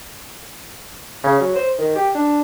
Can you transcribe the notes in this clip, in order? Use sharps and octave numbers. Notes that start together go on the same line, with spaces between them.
C#3
F#3
C5
D#3
G4
D4